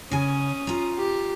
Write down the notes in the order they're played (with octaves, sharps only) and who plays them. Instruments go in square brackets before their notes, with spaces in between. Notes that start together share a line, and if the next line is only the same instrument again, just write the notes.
[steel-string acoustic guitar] C#3 G#5 [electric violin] C#4 D#6
[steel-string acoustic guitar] F4 A#5
[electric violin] G4